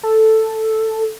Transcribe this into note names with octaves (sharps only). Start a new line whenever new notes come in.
A4